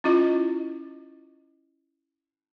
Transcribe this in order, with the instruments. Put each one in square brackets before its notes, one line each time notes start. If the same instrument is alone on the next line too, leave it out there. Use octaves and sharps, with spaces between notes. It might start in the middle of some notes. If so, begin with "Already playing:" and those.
[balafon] C#4 E4 F4 D#5